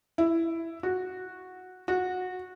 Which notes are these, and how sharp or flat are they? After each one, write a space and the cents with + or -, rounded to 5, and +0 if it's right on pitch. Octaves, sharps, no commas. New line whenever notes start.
E4 +5
F#4 -10
F#4 -20